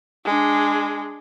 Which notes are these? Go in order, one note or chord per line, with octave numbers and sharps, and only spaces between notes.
G#3 D4